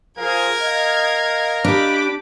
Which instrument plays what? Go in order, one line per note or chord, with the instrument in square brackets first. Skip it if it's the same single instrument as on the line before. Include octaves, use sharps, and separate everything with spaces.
[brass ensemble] F3 G#4 F5 [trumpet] A#4 [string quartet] G#6
[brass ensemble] D#5 F5
[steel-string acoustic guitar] D4 [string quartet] G4 B5 D6